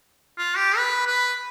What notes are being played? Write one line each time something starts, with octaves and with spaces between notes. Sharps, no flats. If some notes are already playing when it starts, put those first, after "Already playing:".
F4
G4
B4
B4